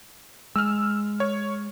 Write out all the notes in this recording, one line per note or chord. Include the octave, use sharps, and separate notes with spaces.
G#3 E6 F6
C#5